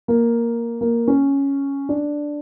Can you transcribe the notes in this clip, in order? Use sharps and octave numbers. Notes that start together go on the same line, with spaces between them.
A#3
A#3
C#4
D4